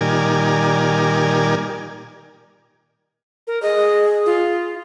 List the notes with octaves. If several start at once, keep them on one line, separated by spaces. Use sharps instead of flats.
A#2 D#3 G3 A#4 D5 G#5
A#4
G#4 D#5
F4